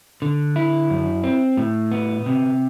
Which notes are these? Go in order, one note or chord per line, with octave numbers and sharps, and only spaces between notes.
D3
E4
F#2
C4
A2
B3
C3